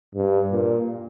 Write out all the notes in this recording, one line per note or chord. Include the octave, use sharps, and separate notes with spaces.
G2
A#2